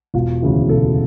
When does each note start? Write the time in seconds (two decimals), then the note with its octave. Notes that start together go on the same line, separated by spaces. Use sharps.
0.14 E1 F4
0.42 D2 C#3 E3
0.69 E1 A4